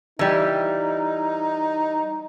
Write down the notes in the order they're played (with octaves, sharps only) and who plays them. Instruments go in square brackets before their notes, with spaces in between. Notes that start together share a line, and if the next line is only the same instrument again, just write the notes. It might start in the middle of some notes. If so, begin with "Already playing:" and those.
[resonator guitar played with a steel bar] E3 G3 [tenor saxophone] D#4